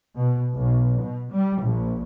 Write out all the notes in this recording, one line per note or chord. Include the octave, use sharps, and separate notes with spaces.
B2
B1
B2
G3
A#1